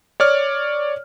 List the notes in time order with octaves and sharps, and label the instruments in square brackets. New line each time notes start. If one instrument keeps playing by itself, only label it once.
[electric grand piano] C#5 D5 F6